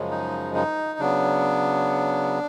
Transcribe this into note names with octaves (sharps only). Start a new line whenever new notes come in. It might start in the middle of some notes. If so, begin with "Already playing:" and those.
Already playing: F#2 C#3 F3 G#3
D#4
D#4
C#3 F#3 B3 D4